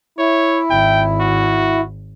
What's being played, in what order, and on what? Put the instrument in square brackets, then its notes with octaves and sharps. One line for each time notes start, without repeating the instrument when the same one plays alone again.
[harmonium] E4 [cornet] C#5
[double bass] G#1 [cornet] G5
[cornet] F#4